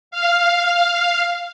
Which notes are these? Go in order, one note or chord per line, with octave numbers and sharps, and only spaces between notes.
F5